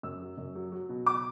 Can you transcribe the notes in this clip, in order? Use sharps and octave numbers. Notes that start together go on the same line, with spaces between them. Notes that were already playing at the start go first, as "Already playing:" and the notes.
F#2 E6
F#3
F#2
F#3
F#3
B2
D6